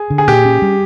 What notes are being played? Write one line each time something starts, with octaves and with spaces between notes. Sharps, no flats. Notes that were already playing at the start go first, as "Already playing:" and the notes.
Already playing: G#4
D3
G#4
A#2 G4
C#4
G3